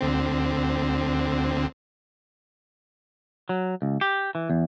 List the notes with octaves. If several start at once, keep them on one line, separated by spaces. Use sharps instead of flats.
D2 D3 C4
F#3
C#2
G4
E3
E2